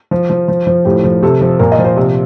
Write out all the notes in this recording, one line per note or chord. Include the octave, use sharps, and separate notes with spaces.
F3
F3
F3
F3
A2 G4
F3
C3 A4
F3
A#2 A#4
D#5
F3
C5
C3